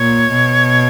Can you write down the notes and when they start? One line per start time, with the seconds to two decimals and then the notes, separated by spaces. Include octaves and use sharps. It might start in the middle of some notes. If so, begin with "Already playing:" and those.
Already playing: A#2 C#5
0.32 B2